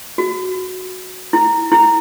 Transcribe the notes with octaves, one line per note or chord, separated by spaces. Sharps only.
F#4
E4
E4